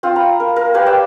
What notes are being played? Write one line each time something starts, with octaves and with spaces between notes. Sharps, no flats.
C4 F4
A#5 B5
A#4
A#4
G4 B4 F5 G#5
D5 E5 G5